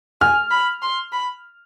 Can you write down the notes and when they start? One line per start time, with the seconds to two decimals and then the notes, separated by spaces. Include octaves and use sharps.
0.21 G#5 F6
0.51 B5
0.82 C6
1.13 B5